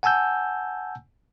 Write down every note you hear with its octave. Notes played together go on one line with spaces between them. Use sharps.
F#5 G#5 A5 E6 G6